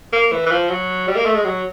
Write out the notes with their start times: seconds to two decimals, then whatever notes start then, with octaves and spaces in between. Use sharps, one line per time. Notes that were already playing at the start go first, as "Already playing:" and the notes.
0.13 A#3
0.32 E3
0.46 E3
0.51 F3
0.69 F#3
1.07 G3
1.16 A#3
1.25 A3
1.35 G#3
1.44 F#3